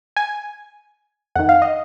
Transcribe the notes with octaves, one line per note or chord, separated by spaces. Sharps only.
G#5
F2 D#3 F#5
F5
D#5